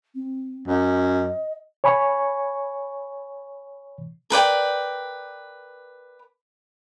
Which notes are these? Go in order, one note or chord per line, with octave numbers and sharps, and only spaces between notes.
C4
F#2 D#5
C#5 G#5 B5 C#6
A#4 B4 D5 G5